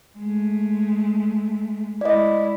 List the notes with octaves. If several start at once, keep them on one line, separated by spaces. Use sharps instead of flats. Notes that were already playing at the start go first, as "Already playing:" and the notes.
G#3 A3
G#3 E4 D5 D#5